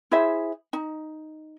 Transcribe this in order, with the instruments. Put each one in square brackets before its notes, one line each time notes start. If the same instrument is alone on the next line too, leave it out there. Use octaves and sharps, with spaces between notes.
[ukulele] E4 G#4 C5 E5
D#4